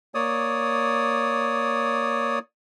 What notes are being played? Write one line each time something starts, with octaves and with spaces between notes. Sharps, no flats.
A#3 C#5 D5 D#6